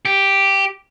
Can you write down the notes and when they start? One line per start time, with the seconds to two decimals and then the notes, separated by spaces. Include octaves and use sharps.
0.05 G4